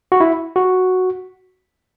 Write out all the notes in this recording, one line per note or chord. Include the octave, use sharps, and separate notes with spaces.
F#4
E4
F#4